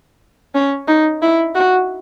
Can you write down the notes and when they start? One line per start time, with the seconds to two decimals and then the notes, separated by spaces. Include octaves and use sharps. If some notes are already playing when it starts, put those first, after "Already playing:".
0.55 C#4
0.88 D#4
1.22 E4
1.55 F#4